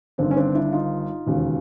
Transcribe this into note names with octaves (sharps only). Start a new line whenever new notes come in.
G1 G2 D#3 C4 D4
C#4
C4 D4
D4 E4
D#4 F4
E1 D#2 C#3